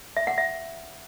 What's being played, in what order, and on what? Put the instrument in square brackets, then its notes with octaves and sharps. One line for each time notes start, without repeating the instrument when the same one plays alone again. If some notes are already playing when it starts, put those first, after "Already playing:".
[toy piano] E5
F#5
E5